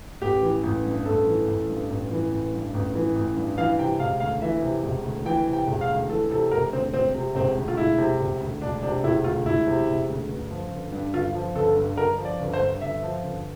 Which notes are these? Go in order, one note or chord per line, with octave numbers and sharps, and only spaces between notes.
A1 G4
E3
A1
G2
A1 A4
E3
A1
G2
A1
E3
A1
G2
A1
E3
A1
G2
E3 F5
C3 G5
E1 F5
D2 F5
E3 E5
C3
E1
D2
E3 G5
C3
G5
E1
F5
D2
E3 A4
C3 A4
E1 A#4
D2 C4
E1 C4
C3
E1 C4
D2
F4
E1 E4
C3
E1
D2
E1 D4
C3 D4
E1 E4
D2 F4
E1 E4
C3
E1
D2
G1
F3
G1
G2
G1 F4
F3
G1 A4
G2
G1 A#4
F3
D5
G1
C5
G2
G1 E5
F3
G1